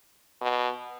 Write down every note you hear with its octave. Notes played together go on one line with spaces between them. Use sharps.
B2